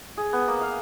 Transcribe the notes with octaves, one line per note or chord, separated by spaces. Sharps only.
G#4
B3
A#3
F5